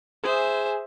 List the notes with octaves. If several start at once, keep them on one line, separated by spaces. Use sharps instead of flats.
G#4 C5 E5